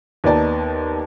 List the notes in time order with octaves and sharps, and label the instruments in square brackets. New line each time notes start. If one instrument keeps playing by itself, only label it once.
[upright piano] D#2 B3 D#4 D5 A5